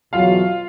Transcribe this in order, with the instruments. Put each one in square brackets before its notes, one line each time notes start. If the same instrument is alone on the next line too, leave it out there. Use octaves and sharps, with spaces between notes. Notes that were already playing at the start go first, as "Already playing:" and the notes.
[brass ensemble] E2 B2 F#3 [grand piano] F4 F5